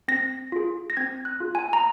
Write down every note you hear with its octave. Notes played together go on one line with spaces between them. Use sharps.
C4 A#6
F4 G#4
A#6
C4 G#6
F#6
F4 G#4
G#5
A#5